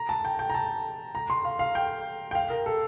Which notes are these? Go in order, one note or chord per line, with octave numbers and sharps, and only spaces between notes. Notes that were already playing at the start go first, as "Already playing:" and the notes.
Already playing: A#5
A5
G5
G5
A#5
A5
A#5
C6
F5
F5
G5
G5
F5
A#4
A4